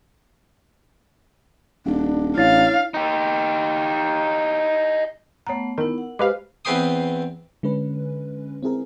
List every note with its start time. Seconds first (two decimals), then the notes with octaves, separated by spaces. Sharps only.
1.86 D#1 D4
2.37 A1 E4 C#5 F5 A6
2.94 D#4 G4
5.47 A3 B3 C#5 F#5 A#5
5.78 D#3 B3 E4 A#4
5.98 F#5
6.19 G#3 G4 B4 C5 F5 D6
6.65 E2 C4 B4 G5 C6 D#6
7.63 D3 G#3 C#4 B4
8.63 C4 E4 G#4 A#4